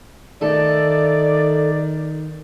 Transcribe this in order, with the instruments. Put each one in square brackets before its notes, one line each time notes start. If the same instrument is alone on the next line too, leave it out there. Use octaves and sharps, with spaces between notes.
[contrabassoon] D#3 [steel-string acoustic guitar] A3 A4 [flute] D5